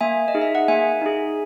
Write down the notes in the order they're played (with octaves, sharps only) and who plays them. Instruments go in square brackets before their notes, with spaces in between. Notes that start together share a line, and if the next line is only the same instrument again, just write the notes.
[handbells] A#3 E5 G#5
D#5
D#4 G#4
E5
F#5
A#3 E5 G#5
D#4 G#4